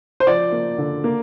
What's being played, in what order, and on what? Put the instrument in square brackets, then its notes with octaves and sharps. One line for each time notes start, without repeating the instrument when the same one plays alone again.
[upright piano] C5
F3 D5
A#3
D3
A#3